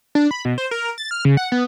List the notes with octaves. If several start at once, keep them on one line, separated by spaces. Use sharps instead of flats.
D4
B5
B2
C5
A#4
A6
F6
C#3
F#5
B3